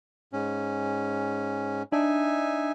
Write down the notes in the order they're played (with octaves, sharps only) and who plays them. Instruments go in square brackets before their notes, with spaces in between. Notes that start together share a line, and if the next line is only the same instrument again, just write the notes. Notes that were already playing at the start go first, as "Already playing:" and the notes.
[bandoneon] G#2 C#4
[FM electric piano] D4 [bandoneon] D#4 E5 G#5